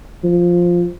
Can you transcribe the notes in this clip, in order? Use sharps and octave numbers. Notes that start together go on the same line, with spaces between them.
F3